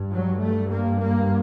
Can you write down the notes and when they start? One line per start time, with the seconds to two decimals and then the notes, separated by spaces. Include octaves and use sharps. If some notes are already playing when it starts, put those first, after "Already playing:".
Already playing: G2
0.13 F#3
0.42 A3
0.70 A#3
1.00 A#3